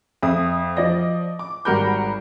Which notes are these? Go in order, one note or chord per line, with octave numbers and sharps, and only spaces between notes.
F2 E5 D#6
F3 D5 D#5 A#6
D6
G#1 G3 F#4 A#4 B5 G6